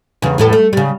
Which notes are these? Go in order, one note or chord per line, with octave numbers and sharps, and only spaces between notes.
E2 C#3
E2 A2 A4
A3
C#3 G3